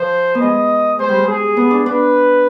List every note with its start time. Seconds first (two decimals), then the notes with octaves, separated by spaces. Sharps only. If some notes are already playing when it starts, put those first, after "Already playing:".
Already playing: F3 C5
0.35 B3
0.42 G#3 D#5
0.99 G#3 C5
1.09 G3
1.19 G#3
1.27 G#4
1.57 B3
1.71 D4
1.85 D4 B4